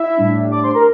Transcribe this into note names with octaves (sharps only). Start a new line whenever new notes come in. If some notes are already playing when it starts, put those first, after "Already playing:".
Already playing: E4 E5
A2 G3 D4
D5 D6
C5 C6
A#4 A#5